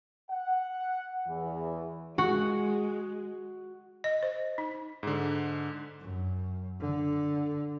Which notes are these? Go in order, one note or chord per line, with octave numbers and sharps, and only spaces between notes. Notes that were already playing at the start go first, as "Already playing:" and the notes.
F#5
E2 E3
G#3 F#4
D#5
C5
D#4
G#2 D3
F#2
D3